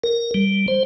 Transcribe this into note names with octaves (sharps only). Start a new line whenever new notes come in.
A#4
G3
C5